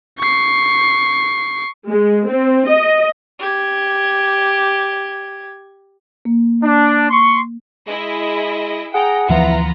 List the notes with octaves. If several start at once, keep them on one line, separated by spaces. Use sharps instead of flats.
C#6 C7
G#3
C4
D#5
G4 G#6
A#3
D4
C6 C#6
G#3 E4 G#4 D#5
G#4 F#5 G5 A#5
D2 E3 F3 B3 E4 F4 A#5